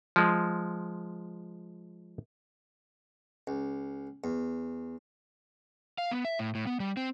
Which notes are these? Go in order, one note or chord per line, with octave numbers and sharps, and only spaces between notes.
F3 G#3
C#2
E2
F5
B3
E5
A2
A2
B3
G3
C4